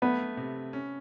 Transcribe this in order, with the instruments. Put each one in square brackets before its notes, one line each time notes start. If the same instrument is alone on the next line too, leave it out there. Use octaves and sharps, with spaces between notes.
[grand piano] A3 [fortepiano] B3
[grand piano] C3
C#4